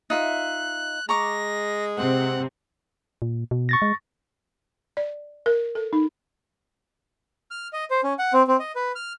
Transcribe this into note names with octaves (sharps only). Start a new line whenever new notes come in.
D#4 F4 E5 F#6
G#3 A#5 C#6 D6 A#6
C3 C4 F#5
A#2
B2
C#6 A6 A#6
G#3
D5
A#4
A4
D#4
F6
D#5
C5
C#4
F#5
C4
C4
D#5
B4
F6